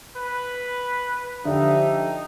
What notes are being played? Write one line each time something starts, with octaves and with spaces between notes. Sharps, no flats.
B4
D3 F3 D#4 G4 E5